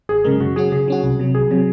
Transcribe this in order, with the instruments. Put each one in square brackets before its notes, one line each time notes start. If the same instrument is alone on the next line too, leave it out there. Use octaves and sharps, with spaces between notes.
[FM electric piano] G#1 [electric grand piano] G#4
[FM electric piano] F#2 C#3 G#3 [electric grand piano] A#4
[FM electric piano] C#3 [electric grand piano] F#4
[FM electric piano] F#3 C#4 F#4 [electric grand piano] G#4
[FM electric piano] C#3 [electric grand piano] G#4
[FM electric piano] F#3 C#4 F#4
C2
C3 F#3
[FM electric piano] C2 [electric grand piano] G#4
[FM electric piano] C3 F#3